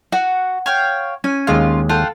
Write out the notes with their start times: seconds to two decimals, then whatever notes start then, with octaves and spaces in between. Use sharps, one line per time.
0.12 F#4 F#5
0.66 C#5 F5 G5
1.24 C#4 G#5
1.47 D#2 G#3 F4 F5
1.89 F4 A4 F#5 G5